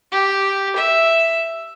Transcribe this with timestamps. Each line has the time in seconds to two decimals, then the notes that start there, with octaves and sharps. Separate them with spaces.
0.12 G4
0.76 E5